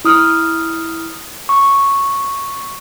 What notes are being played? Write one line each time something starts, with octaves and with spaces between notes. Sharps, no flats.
E4 D#6 F6
C#6